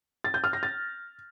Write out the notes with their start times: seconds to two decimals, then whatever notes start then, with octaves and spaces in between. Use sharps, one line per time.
0.24 A6
0.34 G6
0.44 F6
0.53 A#6
0.63 A6